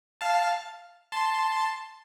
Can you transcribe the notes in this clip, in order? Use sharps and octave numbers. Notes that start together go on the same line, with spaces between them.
F5 A5
A5 C6